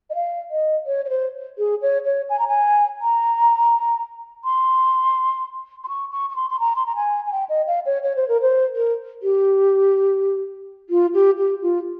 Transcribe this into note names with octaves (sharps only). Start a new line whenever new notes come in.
D#5
F5
D#5
C#5
C#5
C5
G#4
C#5
C#5
G#5
A#5
G#5
A#5
C6
C6
C#6
C#6
C#6
C6
C6
A#5
C6
A#5
G#5
G#5
G5
D#5
F5
C#5
C#5
C5
A#4
C5
A#4
G4
F4
G4
G4
F4